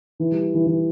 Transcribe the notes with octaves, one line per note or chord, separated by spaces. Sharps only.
E3
G3
E3
E3